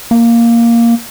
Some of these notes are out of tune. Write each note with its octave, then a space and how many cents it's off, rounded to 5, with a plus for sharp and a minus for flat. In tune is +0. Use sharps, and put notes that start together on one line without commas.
A#3 +0